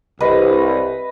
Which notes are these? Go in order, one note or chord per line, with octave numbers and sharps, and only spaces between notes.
C2 B4 D#5